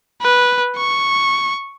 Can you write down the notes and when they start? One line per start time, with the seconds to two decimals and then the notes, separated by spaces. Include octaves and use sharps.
0.22 B4
0.77 C#6